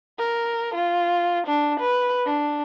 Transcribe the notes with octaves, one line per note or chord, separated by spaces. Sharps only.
A#4
F4
D4
B4
D4